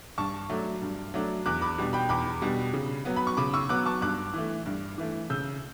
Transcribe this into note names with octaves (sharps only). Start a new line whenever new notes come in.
G2 A5 C#6
F#3 A3 D4
G2
F#3 A3 D4
E2 D6 F#6
B5 D6
B2 G3 D4
G5 B5
E2 B5 D6
B2 G3 D4
C#3
F#3 B3
B5
C#6
C#3 B5 D6
C#6 E6
F#3 B3 D6 F#6
A5 C#6
G2 D6 F#6
E3 A3
G2
E3 A3
C#3 E6 G6